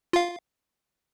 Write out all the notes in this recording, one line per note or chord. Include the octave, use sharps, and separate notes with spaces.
F4 F5